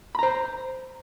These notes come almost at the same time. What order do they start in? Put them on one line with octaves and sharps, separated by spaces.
B5 A#5 C5